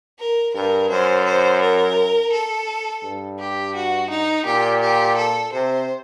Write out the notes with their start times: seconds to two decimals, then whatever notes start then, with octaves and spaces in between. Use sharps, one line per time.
0.19 A#4
0.54 G2 A#4
0.90 F#2 C5
1.25 C5
1.62 A#4
2.32 A4
3.03 G2
3.39 G4
3.75 F#4
4.10 D#4
4.46 A#2 G4
4.82 G4
5.17 A4
5.53 C3 C5